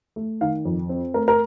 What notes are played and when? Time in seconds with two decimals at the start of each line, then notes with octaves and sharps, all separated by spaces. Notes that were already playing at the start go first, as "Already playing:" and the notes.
0.16 A3
0.41 D#3 F5
0.65 F2
0.89 C4
1.14 A3 A#4
1.28 A#4